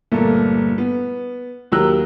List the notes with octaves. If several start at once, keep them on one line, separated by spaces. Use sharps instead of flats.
G1 A#2 A3 A#4
B3
D#2 F#3 G4 A#4 E6 F#6